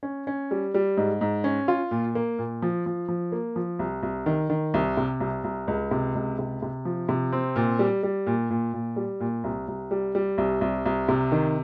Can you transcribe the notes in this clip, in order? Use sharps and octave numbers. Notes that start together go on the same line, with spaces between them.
C#4
C#4
G3
G3
G#2
G#2
C#4
F4
A#2
A#3
A#2
F3
F3
F3
A#3
F3
C2
C2
D#3
D#3
C2
C3
C2
C2
C#2
C3
C#2
C3
C3
F3
C3
C4
A#2
G3
G3
A#2
A#2
A#2
G3
A#2
C2
C2
G3
G3
C2
C2
C2
C3
D#3